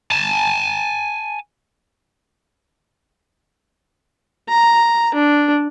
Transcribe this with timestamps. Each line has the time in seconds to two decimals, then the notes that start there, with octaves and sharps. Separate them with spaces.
0.11 G#5 A5
4.49 A#5
5.14 D4